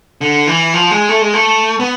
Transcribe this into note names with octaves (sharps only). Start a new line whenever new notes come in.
D3
E3
F3
G#3
A3
G#3
A3
B3